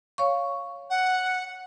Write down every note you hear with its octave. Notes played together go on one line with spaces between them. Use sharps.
C#5 F5 C#6
F#5